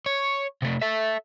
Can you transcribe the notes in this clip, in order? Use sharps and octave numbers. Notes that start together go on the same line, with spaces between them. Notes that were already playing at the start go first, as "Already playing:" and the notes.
C#5
C3 A3
A4 E5